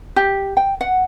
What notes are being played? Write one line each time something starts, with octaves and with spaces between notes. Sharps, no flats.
G4
G5
F#5